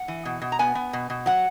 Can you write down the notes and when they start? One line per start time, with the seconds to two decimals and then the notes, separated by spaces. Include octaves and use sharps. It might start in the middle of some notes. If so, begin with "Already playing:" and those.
Already playing: F#5
0.08 E3
0.25 B2
0.42 B2
0.52 A#5
0.59 B3 G#5
0.75 B3
0.93 B2
1.10 B2
1.26 F#3 F#5